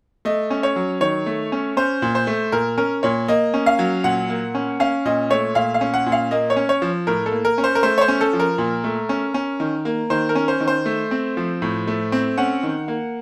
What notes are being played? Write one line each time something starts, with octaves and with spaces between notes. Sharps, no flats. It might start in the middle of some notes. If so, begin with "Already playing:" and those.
A3 D#5
C#4
C#5
F#3
D#3 C#5
A3
C#4
C#4 C5
A#2
C5
A3
A#2 A#4
C#4 A#4
A#2 C#5
A#3 D#5
C#4
F5
F#3
A#2 F#5
A#3
C#4
C#4 F5
A#2 D#5
A3 C#5
A#2 F5
F5
C#4
F#5
A#2
F5
A#3 D#5
C#5
C#4
C#5
F3
A2 A#4
A4
A#3
A#4
C#4
C5
A#4
A3 C5
C#5
C5
C#4
A4
F3
A#4
A#2
A3
C#4
C#4
D#3
A#3
D#3 C5
A#4
C#4
C5
D#3
C5
A3
C4
F3
A2
A3
C4
C#4 F#5
D#3
A#3